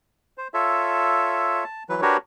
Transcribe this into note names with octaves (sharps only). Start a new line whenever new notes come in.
C5
F4 A4 C#5 E5
A5
E3 F#3 B4
D4 F#4 G4 A#4 B4 C#5